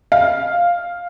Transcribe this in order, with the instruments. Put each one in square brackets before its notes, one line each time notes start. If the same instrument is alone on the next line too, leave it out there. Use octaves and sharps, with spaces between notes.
[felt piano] F5